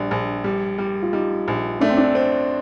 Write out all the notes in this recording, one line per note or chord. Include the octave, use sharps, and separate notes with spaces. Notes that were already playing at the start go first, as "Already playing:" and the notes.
Already playing: A#1 G3 D4
A#1
G3
G3
F4
G3 D#4
A#1
A3 D4
C4
D4
C4